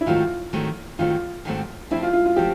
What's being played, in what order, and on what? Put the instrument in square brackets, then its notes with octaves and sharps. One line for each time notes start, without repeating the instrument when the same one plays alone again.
[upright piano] E4
[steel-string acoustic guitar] G#2 D#3 F#3 A3 C4 [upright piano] F4
[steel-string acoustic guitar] G#2 D#3 F#3 A3 C4
[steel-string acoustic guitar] G#2 D#3 F#3 A3 C4 [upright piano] F4
[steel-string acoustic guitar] G#2 D#3 F#3 A3 C4
[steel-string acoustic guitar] F3 A3 C4 [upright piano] E4
[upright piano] F4
F4
F4
[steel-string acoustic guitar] F3 A3 C4 [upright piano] G4